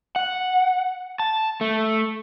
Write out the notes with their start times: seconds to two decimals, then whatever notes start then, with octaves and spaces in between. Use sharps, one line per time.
0.16 F#5
1.20 A5
1.61 A3